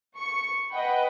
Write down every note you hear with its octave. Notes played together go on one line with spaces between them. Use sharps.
C#6 C#7
B4 D#5 F#5 G5 B5